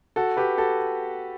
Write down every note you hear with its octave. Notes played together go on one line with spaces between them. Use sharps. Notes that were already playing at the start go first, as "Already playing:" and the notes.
F#4 A4
G4 B4
F#4 A4